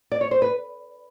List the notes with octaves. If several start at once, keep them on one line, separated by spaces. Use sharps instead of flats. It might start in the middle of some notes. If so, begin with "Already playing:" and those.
D5
C#5
C5
B4